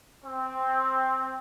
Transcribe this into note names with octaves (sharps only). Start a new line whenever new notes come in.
C4